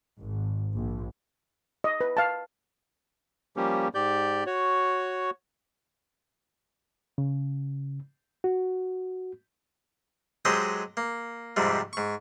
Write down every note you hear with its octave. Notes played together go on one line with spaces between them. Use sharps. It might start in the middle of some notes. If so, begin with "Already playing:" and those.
G#1
A#1
D#5
B4
F5 A5
F3 G3 A#3 C#4 G4
G#2 G4 D5 G6
F#4 C#5
C#3
F#4
F#3 G#3 G4 A4 C5 D#5
A#3
F2 G#2 C3 G3
G#2 C#6